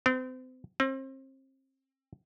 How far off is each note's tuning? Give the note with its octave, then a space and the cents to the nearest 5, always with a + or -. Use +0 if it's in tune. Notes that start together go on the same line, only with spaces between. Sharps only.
C4 -35
C4 +35